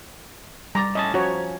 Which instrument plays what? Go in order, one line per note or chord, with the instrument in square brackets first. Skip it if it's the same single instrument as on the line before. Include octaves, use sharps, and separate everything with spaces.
[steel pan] G3 A#5 [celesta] C6 D6 A6
[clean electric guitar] A2 C#4 A5 [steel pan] D#5
[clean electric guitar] F3 C#4 [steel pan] F#4 C#5 [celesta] C5 G#5 A#5